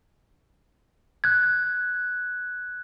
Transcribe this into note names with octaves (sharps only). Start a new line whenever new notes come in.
F#6 G#6